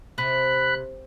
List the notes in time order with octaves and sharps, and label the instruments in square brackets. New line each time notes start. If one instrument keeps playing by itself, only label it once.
[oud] C3 [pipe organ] B5 F#6